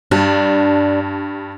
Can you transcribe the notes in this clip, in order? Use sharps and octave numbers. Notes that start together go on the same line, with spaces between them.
G2 D4